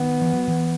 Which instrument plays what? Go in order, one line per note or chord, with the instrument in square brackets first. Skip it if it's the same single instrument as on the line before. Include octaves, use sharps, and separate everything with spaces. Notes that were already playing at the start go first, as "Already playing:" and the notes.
Already playing: [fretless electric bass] D#3 [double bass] B3
[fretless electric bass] E3
F#3
E3